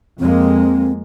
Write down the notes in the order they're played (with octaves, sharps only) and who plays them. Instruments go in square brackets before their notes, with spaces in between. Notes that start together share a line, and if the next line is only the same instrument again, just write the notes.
[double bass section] F2 G#3 A#3 [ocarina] C4